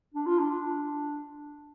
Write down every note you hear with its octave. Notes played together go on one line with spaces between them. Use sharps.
D4
F4
D4